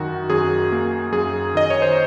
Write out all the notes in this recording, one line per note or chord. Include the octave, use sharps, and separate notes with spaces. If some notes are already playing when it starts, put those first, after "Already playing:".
Already playing: F#2 D#3 F#4
F#2 G#4
A#3
F#2 G#4
D#3 D#5
C#5
C5